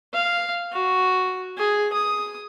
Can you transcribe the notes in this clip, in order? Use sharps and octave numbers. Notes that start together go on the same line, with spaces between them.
F5
F#4
G#4
D#6